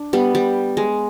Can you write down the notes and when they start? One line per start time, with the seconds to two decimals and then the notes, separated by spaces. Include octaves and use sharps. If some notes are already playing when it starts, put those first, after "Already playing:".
Already playing: D4
0.13 G3 B3
0.35 G3
0.77 G#3